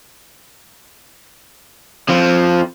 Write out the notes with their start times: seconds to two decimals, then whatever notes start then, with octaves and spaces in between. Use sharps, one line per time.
2.09 F2 F3